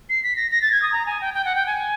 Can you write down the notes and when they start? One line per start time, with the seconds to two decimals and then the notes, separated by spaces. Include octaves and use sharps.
0.10 C7
0.23 B6
0.36 A#6
0.51 A#6
0.62 A6
0.72 G#6
0.82 D#6
0.92 A#5
1.06 G#5
1.21 G5
1.34 G5
1.45 F#5
1.56 G5
1.66 G#5